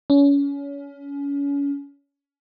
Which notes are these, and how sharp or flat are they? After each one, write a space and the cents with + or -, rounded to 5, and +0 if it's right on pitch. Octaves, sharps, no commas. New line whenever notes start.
C#4 +30